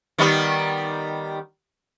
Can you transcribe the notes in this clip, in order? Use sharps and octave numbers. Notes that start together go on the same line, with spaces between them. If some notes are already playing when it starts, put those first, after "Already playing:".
D#3 G3 B3